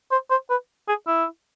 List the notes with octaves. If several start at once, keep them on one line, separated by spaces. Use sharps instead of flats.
C5
C5
B4
G#4
E4